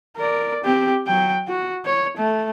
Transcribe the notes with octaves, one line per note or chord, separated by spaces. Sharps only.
A#4 D5
C4 G4
F#3 G5
F#4
C#5
A3